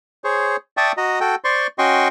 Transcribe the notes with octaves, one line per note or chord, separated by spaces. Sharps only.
G#4 C5 C#5
D5 E5 G5 A5 C#6 D#6
F#4 D#5 A#5
F#4 A4 G5
C5 D5 C6 C#6
C#4 F#4 D#5 G5 C6 C#6